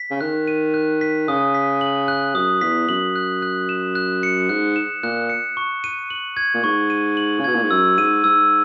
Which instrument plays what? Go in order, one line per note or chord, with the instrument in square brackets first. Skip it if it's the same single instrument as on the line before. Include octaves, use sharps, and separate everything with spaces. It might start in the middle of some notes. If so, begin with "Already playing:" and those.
Already playing: [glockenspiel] B6
[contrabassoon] C#3
[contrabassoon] D#3 [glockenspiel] F#6
[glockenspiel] D#7
F#6
B6
[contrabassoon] C#3 [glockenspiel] D#6
[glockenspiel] B6
F#7
F#6
[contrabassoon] F#2 [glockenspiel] D#6
[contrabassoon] E2 [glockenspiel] B6
[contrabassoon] F#2 [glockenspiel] F#7
[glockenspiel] F#6
F#6
E7
F#6
C#7
[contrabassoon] G#2 [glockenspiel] F#6
[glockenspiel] E7
[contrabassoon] A#2 [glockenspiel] F#6
[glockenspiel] C#7
C#6
D#7
F#7
G#6
[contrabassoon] A#2
[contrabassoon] G#2 [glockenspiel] C#6
[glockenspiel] D#7
F#7
[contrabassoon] C#3
[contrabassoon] B2 [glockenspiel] G#6
[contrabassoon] A#2
G#2
[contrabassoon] F#2 [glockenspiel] E6
[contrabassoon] G#2 [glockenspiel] D#7
[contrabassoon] G#2 [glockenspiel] E6